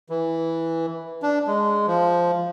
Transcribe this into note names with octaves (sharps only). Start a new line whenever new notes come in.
E3
D4
G#3
F3